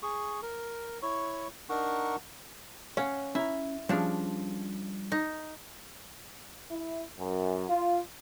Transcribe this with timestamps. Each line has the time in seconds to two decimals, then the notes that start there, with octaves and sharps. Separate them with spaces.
0.03 G#4 C#6
0.42 A#4
1.02 E4 C#5 C#6
1.70 D4 D#4 A#4 F#5 C#6
2.97 C#4 C#5 F5 F#5
3.35 C#4 E4 A#5
3.89 F3 G3 C#4 D4 G#4
5.12 D#4
6.71 E4
7.18 F#2
7.69 F4